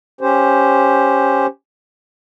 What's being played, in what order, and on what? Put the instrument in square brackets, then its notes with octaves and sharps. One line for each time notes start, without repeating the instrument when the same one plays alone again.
[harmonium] C#4 G4 C5